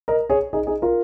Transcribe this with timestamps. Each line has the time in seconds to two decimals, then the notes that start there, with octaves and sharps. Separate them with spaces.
0.08 A#4 D#5
0.30 G#4 C#5
0.53 D#4 G#4
0.67 D#4 G#4
0.82 F4 A#4